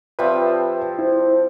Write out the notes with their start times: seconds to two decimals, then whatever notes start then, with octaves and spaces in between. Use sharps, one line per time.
0.19 F3 G3 C4 B4 E5
0.99 E4 C5